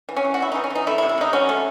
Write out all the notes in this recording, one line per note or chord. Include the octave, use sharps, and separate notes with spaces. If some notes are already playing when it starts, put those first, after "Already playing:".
E3
C#4
E3
F#4
C#4 E4
D#4
E3
C#4
E3
D#4
A3 E4
E4
C3
E4
C3 D#4
F#3 C#4
A3